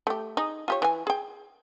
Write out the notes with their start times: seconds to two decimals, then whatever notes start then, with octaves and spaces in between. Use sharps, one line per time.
0.07 A3 G4
0.37 D#4 G#4
0.68 F4 G4 C#5
0.82 E3 G#5
1.07 G#4 G5